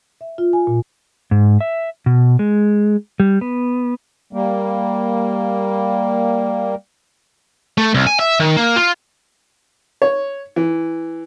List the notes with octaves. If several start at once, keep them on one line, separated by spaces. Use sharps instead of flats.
E5
F4
G#5
A#2
G#2
E5
B2
G#3
G3
B3
G3 A#3
A3
C2
G#5
E5
D#3
A#3
F4
C#5
E3